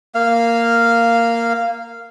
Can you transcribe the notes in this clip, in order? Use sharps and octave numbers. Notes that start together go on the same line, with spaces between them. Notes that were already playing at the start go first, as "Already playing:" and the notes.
A#3 F5